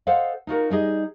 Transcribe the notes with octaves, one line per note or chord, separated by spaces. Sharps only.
A4 C5 D#5 F5 F#5
D#4 F4 F#4 A#4
G3 D#4 G#4 D#5